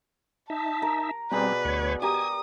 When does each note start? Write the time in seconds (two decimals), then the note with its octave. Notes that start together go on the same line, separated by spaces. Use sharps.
0.50 D#4 E5 A5
0.82 A#4
1.31 B2 G3 C4 G#4 B4 D5
1.65 D2 C#5
2.02 G4 A#4 G#5 D#6